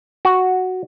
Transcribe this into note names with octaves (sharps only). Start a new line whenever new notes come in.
F#4